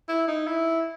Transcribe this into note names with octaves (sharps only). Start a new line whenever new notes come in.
E4
D#4
E4